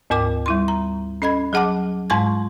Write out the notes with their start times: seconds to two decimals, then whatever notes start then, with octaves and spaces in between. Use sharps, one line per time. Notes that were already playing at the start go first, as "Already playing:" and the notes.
0.10 D2 G#2 A#4 G5 D6
0.46 G3 E4 C6
0.68 A#5
1.22 C#4 A4 D#5 B5 G#6
1.53 F#3 G#4 F#5 A5 D6
2.10 G#2 G#3 A5 C6 C#6 G#6